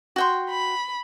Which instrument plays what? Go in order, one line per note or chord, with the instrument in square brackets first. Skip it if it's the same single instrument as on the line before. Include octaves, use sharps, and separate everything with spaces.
[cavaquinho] F#4 G5 C6
[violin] B5